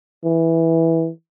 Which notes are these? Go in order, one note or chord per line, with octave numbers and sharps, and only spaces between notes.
E3